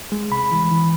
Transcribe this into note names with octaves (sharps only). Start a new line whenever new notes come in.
G#3
C3 B5
E3
E3